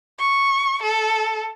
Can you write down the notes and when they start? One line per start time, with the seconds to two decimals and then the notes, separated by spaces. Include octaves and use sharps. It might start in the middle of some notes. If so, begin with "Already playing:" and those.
0.19 C#6
0.83 A4